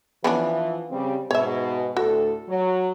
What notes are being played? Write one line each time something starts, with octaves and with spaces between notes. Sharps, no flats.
E3 F3 B3 C#4 D4
C#3 G3 C4
G#2 B2 C#5 E5
D2 A2 F#4 A4
F#3